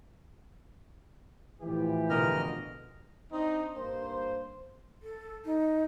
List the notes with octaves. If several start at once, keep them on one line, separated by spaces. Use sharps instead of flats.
A2 E3 F3 G4
F2 B2 D3 A#4 D#5 F6
C4 D4 D#4
G2 A#3 C5
A4
D#4